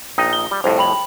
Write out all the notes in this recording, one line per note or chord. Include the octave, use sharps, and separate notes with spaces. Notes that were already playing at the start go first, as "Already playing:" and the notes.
A#1 D#4 D#5 G5
G7
G3
C2 F2 A2 C5
G5 B5 F#7